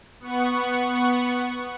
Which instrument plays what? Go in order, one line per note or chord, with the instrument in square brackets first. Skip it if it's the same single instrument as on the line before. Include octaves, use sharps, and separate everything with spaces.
[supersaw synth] B3 F#5 C#6